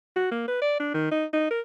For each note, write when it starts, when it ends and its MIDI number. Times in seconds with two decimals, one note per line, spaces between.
0.16 0.27 66
0.31 0.47 58
0.48 0.60 71
0.62 0.76 74
0.80 0.91 62
0.94 1.11 51
1.11 1.25 63
1.33 1.47 63
1.51 1.60 70